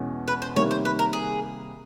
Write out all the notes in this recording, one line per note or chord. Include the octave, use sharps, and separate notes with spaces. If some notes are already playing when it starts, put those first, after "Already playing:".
Already playing: E2 B2 G#3 C#4 F#4
B4
C5
C3 D#3 G3 A#3 C#5
C5
B4
A#4
G#4